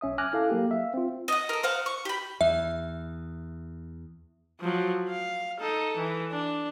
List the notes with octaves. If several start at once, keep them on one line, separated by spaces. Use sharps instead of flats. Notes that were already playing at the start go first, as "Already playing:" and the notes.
B1 C#4 E5 D#6
G#5 D6 F6 F#6 A#6
E4 A4 F5
F#3 A#3 G4
E5 F5
C4 F4
D#5 F#5
A4 A#4
C5 F5 F#5
C#6
G4 B5
E2 E5
F3 F#3
F5
D#4 A4
E3
D4